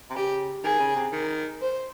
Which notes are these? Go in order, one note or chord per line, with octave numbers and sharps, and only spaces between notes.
C3
C#3 G4
D#3 G#4
C#3
C3
D#3
C5